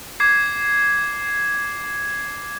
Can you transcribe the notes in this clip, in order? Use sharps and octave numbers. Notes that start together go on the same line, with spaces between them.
D6 G#6 C7